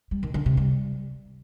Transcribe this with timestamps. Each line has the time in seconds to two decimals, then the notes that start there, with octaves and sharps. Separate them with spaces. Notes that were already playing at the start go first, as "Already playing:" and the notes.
0.11 G3
0.23 D#3
0.34 D3
0.46 C3
0.57 G3